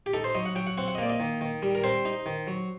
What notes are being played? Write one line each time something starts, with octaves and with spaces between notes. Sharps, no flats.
G4
D#4 A4
C5
F#3 D#5
F#5
F#3 G5
F#5
C4 F#5
F#5
D#5
A#3 D5
D#5
D#3
D#3
G3
A#4
C4 C5
D#4
D#3
F#3